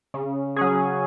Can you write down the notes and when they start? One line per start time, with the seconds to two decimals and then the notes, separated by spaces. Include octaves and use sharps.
0.14 C#3
0.56 F#3 C#4 G#4